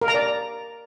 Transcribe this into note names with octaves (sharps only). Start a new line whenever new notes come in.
A#4
A#5
D5